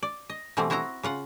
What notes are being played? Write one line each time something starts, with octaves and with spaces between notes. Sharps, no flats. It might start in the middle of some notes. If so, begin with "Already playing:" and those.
D5
D#5
B2 E3 G3 A3 C4
C4 E4 F#4 D#5 A#5
C#3 F4 F#5